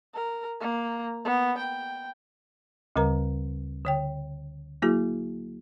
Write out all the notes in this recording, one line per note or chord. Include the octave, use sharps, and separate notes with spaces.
A#4
A#3
B3
G5
D2 C#3 G3 A#4 A#5
D3 C#5 G5
F#3 A#3 E4 F#4 G#4